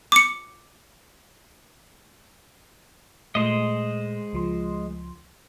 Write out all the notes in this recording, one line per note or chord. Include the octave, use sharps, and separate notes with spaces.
D6 C#7
A#2 G#3 A3 C5 D#5
C#2 F3 C6